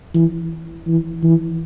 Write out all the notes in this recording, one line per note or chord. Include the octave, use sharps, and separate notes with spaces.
E3
E3
E3